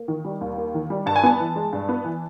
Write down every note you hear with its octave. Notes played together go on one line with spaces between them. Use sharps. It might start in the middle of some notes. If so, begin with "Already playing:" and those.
Already playing: A#3
D#3
G3
D#2
A#3
D#3
G3
G2 A5
G#5
B3 A5
E3
G#3
G2
B3
E3